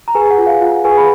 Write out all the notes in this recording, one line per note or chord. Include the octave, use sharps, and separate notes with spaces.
A#5
G#4 B4 G#5
F#5
F4
F5
F4 F#5
G#4 B4 G#5
B5